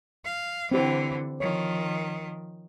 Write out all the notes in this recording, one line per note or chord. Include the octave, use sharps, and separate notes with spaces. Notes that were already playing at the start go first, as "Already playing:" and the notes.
F5
D3 E3 C4 G4
D#3 F3 C#5